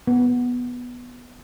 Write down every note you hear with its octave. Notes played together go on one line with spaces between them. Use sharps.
B3